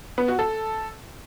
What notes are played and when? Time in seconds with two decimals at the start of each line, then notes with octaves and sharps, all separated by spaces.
0.18 B3
0.28 F#4
0.39 A4